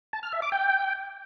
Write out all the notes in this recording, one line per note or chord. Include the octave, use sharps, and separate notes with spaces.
A5
F6
E5
D6
G5